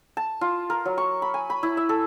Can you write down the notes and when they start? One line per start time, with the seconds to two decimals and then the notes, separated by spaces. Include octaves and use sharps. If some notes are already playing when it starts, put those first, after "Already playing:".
0.17 A5
0.41 F4
0.70 A#4
0.85 F#3
0.98 C#6
1.22 B5
1.34 G#5
1.50 B5
1.63 E4
1.77 E5
1.89 A4